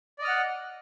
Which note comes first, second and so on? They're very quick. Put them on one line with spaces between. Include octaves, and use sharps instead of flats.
D5 D#5 F6 F#5